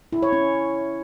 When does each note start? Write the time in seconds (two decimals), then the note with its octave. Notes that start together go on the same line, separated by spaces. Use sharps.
0.13 E4
0.23 C#5
0.33 C#4